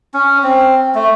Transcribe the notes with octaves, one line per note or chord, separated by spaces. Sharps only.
C#4
C4
A3